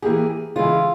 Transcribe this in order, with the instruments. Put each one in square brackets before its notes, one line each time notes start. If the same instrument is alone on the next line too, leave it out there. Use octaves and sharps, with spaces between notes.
[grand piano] E3 A#3 E4 G4 [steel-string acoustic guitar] G#4
[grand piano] C#3 E3 G#3 E4 G#4 [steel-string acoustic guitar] F4